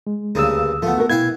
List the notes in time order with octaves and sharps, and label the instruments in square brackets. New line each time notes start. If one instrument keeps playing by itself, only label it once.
[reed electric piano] G#3
[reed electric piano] D2 D#6 E6 [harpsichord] G2 C#3 A#3
[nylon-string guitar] F3 [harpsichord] A3 B3
[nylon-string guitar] F#4 A#4
[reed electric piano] B2 G#6 [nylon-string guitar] B3 [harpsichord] E4 F5 G5